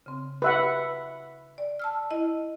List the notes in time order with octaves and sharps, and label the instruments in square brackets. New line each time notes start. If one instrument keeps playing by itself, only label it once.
[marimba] C#3 C4
[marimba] G4 [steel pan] B4 E5 F#5
[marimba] D5
A5 E6 F6
E4 D#5